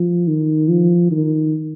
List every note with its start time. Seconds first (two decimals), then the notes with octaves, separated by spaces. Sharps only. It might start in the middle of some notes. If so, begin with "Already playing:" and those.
Already playing: F3
0.27 D#3
0.69 F3
1.11 D#3